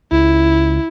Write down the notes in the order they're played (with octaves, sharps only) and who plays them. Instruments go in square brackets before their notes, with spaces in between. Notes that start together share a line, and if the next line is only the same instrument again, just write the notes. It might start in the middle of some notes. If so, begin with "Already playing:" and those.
[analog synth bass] C#2 [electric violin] E4